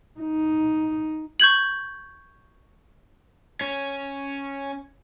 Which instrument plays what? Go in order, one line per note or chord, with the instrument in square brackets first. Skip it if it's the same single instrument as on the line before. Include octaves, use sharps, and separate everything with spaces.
[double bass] D#4
[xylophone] C#6 G6 G#6 F#7
[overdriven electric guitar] C#4